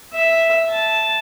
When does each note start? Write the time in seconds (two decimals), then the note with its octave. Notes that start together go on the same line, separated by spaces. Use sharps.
0.13 E5
0.70 A5